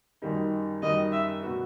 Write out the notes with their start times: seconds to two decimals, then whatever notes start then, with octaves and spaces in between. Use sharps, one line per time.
0.22 F#2 D#3 G3 D#4
0.82 F#2 D#3 G3 D#4 D#5
1.13 E5
1.43 B2 F#3 B3 F#4 B4